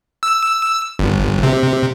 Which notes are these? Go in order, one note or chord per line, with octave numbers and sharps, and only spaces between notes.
E6
G1
C3